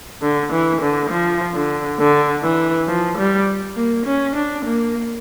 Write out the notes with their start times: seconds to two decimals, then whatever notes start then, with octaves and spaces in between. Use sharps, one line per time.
0.22 D3
0.52 E3
0.82 D3
1.10 F3
1.55 D3
1.99 D3
2.43 E3
2.88 F3
3.17 G3
3.76 A#3
4.06 C#4
4.36 D4
4.65 A#3